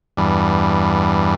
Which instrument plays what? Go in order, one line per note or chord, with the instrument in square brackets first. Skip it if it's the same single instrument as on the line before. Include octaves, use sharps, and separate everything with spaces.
[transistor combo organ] E2 G2